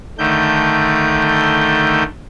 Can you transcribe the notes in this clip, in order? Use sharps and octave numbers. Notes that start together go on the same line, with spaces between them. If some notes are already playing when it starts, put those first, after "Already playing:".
D3 D#3 A3 G6